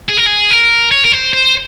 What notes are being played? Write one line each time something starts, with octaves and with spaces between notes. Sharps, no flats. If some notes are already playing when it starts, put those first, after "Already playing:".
G#4
A#4
G#4
A#4
C#5
A#4
C5
C5